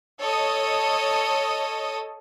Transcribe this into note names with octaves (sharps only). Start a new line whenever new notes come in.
A4 C#5 D#5 D#6